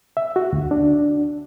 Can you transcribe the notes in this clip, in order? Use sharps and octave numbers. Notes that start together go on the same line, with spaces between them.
E5
F#4
D2
D4